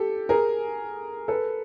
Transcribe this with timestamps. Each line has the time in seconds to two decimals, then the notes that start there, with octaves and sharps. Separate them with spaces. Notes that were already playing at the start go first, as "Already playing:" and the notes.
Already playing: G4 A4
0.29 G#4 A#4
1.28 A4 B4